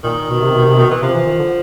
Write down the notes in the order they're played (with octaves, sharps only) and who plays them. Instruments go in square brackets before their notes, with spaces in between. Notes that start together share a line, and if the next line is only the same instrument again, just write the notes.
[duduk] A#2 [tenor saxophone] D#3
[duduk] B2
C3
B2
C3
[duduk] B2 [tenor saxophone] D#3
[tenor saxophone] E3
[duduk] C3 [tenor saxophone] F3
[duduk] E3
D#3
D3